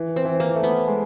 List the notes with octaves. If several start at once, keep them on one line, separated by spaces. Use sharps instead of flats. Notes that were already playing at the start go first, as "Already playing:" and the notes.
Already playing: E3
C4
E3
A#3
A3
B3
G#3